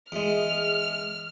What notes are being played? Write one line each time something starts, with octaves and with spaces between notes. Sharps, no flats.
E2 G#3 F6